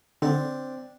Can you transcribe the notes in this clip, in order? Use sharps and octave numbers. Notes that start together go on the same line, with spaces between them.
D3 C4 D4